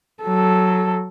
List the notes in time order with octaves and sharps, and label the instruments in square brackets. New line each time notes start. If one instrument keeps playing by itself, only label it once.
[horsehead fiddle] F#3 A4